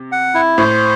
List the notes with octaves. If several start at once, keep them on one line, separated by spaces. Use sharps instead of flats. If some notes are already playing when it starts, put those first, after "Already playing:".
Already playing: C3
F#5
E4
A2 C5